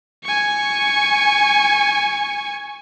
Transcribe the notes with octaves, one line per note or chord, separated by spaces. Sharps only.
G#5 C#6